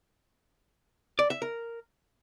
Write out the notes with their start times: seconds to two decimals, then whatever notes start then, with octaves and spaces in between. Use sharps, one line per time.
1.19 D5
1.30 E5
1.42 A#4